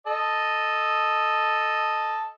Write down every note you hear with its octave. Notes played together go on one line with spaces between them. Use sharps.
A4 D#5